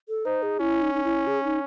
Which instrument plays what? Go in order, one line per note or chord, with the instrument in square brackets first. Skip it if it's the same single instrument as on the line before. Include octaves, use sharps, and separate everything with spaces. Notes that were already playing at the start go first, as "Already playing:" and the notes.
[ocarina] A4
[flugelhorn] D#4 [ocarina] C5
[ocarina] G#4
[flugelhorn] C#4 [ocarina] E4
[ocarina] D#4
D#4
E4
G#4
D#4